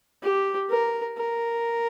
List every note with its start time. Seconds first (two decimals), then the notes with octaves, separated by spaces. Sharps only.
0.23 G4
0.70 A#4
1.17 A#4